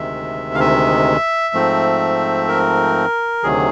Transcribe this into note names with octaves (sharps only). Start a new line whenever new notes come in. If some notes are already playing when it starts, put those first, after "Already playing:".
Already playing: D2 C3 D#3 G#3 E5
F5
E5
G#2 F3 A3 C4
A#4
D2 C3 D#3 F#3 G#4